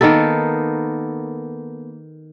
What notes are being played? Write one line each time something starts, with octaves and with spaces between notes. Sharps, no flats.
D#3 A#3 B3 A4